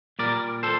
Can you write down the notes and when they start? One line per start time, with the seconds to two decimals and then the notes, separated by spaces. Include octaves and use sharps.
0.19 A#2 G3 A#4 D5
0.63 A4 C5